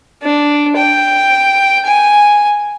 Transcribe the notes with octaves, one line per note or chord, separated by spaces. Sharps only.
D4
G5
G#5